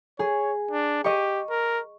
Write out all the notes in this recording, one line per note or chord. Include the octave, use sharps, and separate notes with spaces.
G#4 C#5
D4
G4 D#5 C#6
A#4